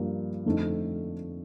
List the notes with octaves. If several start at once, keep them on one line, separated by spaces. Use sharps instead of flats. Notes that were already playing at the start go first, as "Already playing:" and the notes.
Already playing: G2 F3 A#3
F2 D3 A3 C4 D#4